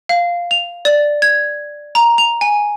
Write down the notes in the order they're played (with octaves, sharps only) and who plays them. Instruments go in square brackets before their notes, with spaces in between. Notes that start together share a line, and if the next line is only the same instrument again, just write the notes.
[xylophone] F5
F7
D5
G#6
A#5
F7
G#5